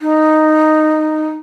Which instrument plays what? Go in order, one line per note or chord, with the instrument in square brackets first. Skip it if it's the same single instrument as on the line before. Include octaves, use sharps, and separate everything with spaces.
[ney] D#4